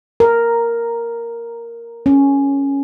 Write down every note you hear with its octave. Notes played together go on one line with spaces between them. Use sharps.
A#4
C#4